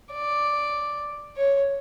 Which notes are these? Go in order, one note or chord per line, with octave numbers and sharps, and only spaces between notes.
D5
C#5